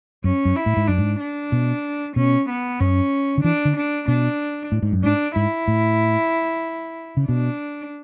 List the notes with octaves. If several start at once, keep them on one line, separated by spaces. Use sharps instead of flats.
F#2 C#4
F#2
E4
A2
G#2
F#2 D4
G#2
D4
B2
B2 C#4
B3
F#2 C#4
D3
E3 D4
D3
D4
B2 D4
A2
G#2
F#2
G#2 D4
G#2 E4
A2
C#3
B2 D4